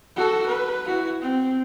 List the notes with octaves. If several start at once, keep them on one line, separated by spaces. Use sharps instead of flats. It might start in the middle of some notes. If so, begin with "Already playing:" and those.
F#4 A4
B4
E4 F#4
C4